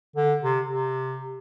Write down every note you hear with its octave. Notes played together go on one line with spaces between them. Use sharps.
D3
C3
C3